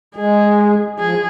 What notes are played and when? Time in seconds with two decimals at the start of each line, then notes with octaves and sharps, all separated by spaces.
0.16 G#3 G#4
0.99 F3 G#4